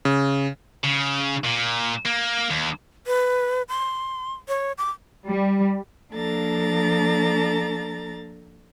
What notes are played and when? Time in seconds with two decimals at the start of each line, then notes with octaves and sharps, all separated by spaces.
0.05 C#3
0.84 C#3
1.44 A#2
2.06 A#3
2.50 D#2
3.07 B4
3.69 C6
4.48 C#5
4.78 D6
5.28 G3
6.13 F3 A#3 D4 A4 A#5 A6